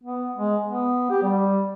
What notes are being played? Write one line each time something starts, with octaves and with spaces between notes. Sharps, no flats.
B3
G#3
B3
G4
G3